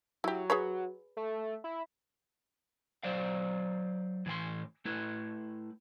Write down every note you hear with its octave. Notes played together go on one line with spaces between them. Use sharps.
F#3 E4 G4
G#4 B4 C#5
A3
E4
F#3 C5 D5 F5
A2 E3 G5 C6
A3 E4 B4